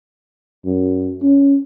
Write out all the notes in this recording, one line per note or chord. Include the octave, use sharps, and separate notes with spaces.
F#2
C#4